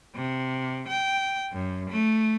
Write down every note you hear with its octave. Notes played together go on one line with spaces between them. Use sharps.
C3
G5
F#2
A3